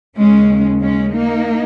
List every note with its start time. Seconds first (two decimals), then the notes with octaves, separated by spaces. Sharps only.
0.17 D#2 C#3 G#3 C#4
0.82 G#3 C#4
1.15 A#3 D#4